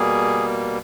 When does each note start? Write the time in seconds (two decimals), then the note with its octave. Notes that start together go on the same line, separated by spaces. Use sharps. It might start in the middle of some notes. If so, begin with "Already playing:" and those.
Already playing: B2 G3 A#3 G#4